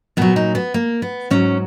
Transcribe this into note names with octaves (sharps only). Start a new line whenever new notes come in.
A#2 F#3 B3
D#4
B3
A#3
B3
G#2 F#3 C#4